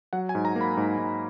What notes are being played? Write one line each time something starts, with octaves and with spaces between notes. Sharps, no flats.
F#3 F#5
G#5
G#2
A#5
A#3
B5
G#2
G#2